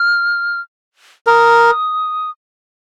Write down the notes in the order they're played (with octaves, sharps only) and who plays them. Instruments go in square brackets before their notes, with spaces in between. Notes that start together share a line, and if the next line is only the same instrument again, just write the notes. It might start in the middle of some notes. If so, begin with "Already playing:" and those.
Already playing: [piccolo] F6
[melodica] A#4 [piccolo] D#6